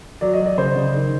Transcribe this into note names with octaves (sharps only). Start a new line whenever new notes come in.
F#3 D5
D#5
F#3
D5
C#3 C5
C#3
D#3